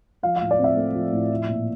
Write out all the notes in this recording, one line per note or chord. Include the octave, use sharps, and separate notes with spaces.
F3 F5
F5
A2
D5
C4
E5
A3
F3
A2
F3
A#2